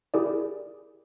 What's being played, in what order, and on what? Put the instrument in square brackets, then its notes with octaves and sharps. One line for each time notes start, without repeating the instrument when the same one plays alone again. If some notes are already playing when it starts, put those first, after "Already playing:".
[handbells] E4 G4 G#4 A#4 D5